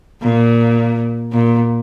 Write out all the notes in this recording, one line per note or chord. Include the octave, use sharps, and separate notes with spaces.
A#2
A#2